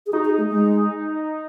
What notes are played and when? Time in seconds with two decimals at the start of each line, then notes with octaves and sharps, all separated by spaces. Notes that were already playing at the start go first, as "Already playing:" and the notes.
0.06 G#4
0.13 D#4 F#4
0.25 G#4
0.38 A3
0.49 G#3